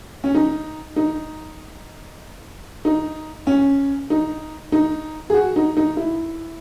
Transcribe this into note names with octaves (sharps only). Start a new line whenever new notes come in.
C#4
D#4
D#4
D#4
C#4
D#4
D#4
G#4
F#4
D#4
D#4
E4